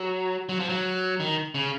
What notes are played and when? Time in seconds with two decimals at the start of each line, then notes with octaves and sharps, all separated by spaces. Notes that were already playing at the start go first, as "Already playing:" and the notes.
Already playing: F#3
0.49 F#3
0.60 F3
0.69 F#3
1.20 D#3
1.55 C#3